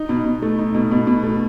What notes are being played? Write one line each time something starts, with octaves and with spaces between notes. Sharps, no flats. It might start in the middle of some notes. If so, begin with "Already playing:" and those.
Already playing: D#4
B2
B2
A3
D#4
B2
B2
B2
A3